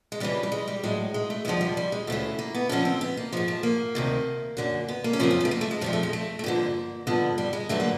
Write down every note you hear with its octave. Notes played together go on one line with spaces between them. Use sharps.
G#3
F2 C#3 E3 G3
G3
G#3
G3
A2 F#3 G#3
G#3
A3
D#2 D3 F3 G#3
G3
G3
G#3
D2 C#3 E3 A3
A#3
B3
F2 D3 F3 C#4
C4
B3
A#3
G#2 F3 G#3
A3
A#3
D2 C3 D#3
F#2 D3 F#3
B3
A#3
C#4
F#2 C#3 F3 C4
C#4
B3
A3
A#3
A3
G#3
F2 D3 F3 G3
A3
G#3
A3
A3
G2 D3 F3 A#3
G2 D3 F3 B3
G3
G#3
G2 D3 F#3 A3
A#3